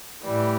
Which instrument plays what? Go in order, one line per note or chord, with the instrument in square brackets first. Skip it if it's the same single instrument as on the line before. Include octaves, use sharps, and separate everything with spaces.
[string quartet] A2 E3 G3